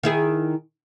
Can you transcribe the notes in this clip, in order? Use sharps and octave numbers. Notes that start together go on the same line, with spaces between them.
D#3 E4 G#4